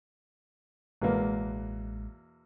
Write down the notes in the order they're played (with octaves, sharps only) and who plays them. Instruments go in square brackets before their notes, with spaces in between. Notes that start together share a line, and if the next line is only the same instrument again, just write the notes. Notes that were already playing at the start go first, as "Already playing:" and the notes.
[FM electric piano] A1 G#3 [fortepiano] E2 B2 A#3